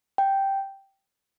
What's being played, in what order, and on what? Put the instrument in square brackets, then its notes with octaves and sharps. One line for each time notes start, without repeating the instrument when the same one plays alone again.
[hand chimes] G5